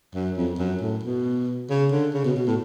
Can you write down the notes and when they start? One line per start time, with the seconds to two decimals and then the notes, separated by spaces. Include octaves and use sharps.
0.15 F#2
0.37 F2
0.59 F#2
0.81 A2
1.03 B2
1.70 C#3
1.92 D3
2.14 C#3
2.25 B2
2.36 B2
2.47 A2